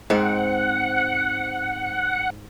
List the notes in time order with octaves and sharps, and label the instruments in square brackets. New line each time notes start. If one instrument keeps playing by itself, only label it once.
[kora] G#2 C4 [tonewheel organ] F#5